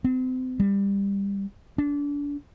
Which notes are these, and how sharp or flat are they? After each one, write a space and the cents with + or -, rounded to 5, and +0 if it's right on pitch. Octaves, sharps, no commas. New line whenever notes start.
C4 -35
G3 +20
D4 -30